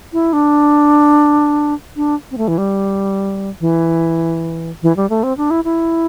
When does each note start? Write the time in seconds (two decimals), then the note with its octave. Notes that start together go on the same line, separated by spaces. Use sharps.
0.13 E4
0.33 D4
1.97 D4
2.31 C4
2.38 A3
2.48 E3
2.58 G3
3.61 E3
4.83 E3
4.97 G3
5.10 A3
5.23 C4
5.37 D4
5.51 E4
5.64 E4